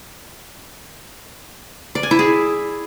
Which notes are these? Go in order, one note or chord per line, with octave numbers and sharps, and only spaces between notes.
D5
G#5
E4
G#4